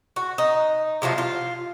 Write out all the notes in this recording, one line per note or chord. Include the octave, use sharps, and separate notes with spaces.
F#4
D#4
C3 F3 F#3 F4
F4